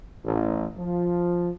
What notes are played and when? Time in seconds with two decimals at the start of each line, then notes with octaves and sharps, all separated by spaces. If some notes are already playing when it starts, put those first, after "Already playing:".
0.24 A1
0.77 F3